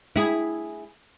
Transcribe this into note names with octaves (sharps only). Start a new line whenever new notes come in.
E4 G#4